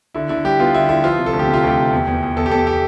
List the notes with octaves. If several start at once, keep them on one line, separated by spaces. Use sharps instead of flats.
D3 E4
D3 E4
G3 G4
B3 F4
D3 E4
D3 E4
F3 F4
C3
A4
D2
G4
C3
F4
D2 G4
C3
E2
E2
E2
E2 A4
G4
E2 A4
G4